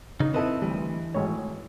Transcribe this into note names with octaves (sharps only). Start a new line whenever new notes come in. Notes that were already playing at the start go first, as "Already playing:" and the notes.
C#3 D#4
C4 E4 A4 B4 D#5
D2 E3 G3
G#1 A2 C#5